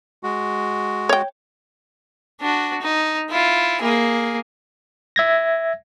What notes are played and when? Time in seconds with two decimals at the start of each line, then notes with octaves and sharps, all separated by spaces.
0.23 G#3 F#4
1.09 C#5 G5
2.41 D4 F#4
2.82 D#4
3.30 E4 F4
3.82 A#3 G#4
5.16 E5 G#6 A#6